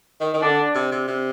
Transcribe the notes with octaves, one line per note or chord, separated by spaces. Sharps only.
D#3
D#3
D3 D4
C3
C3
C3